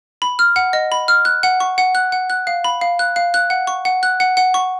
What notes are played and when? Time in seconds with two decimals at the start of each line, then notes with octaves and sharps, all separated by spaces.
0.22 B5
0.39 F6
0.56 F#5
0.73 D#5
0.92 B5
1.08 F6
1.25 F#6
1.43 F#5
1.60 C#6
1.78 F#5
1.95 F#6
2.12 F#5
2.30 F#6
2.47 F5
2.64 B5
2.81 F5
2.99 F#6
3.16 F5
3.34 F#6
3.50 F#5
3.67 C#6
3.85 F#5
4.03 F#6
4.20 F#5
4.37 F#5
4.54 C#6